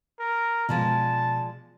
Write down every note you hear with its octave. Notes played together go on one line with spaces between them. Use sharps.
A#4
B2 F3 G#3 D5 A5